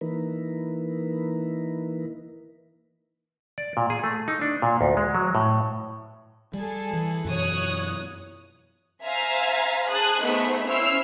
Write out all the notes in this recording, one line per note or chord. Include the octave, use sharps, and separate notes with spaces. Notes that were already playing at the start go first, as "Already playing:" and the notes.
E3 A#3 D#4 E4 A#4 B4
D5
A#2
G#4
A3
D#4
D4
A#2
D2
G#3
F#3
A2
G3 G#4 A4
E3
F#2 B2 E3 C#5 D#6 F#6
C5 E5 F5 G#5 A#5
G#4 C5 A5 D#6 F#6
A3 B3 D#4 G#4 C5 E5
C#4 E4 C5 E6 F6 C7